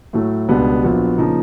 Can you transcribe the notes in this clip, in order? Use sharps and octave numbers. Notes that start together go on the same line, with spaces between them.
A2 F#3 A3
C#2 B2 G3 B3 D4
A#1 A#2 F#3 B3
C#3 F3 A#3 D#4